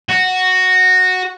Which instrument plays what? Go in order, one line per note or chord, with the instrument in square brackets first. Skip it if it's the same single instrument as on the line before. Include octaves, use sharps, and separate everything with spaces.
[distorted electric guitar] F#4